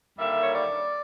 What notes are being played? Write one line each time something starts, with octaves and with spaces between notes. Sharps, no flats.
D#2 D3 G3 A#3 E5
C#5
D5